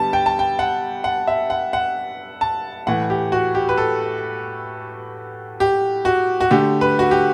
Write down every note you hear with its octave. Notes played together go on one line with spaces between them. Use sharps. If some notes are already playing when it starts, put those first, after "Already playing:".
Already playing: D3 G3 B3 A5
G5
A5
G5
F#5
F#5
E5
F#5
F#5
A5
A2 E3 A3 F#5
G4
F#4
G4
B4
A4
G4
F#4
F#4
D3 A3 G4
B4
F#4
G4